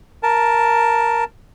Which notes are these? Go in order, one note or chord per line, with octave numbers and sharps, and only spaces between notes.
A#4 A5